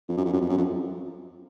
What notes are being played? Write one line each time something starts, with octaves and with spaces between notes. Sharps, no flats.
F2
F#2
F2
F#2
F2
F#2
F2